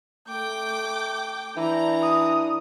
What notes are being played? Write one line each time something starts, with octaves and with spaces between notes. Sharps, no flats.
A3 G5 D6 G6
E3 D4 A#5
D#6